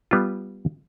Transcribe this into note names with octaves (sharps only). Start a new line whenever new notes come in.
G3 B3 F4